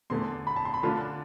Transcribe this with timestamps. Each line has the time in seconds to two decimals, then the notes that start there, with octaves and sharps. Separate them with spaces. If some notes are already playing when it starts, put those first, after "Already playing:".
0.10 E2 D3 A3 C6
0.47 B5
0.56 A5
0.65 C6
0.74 B5
0.83 D3 A3 D4 F4 A5
1.01 A5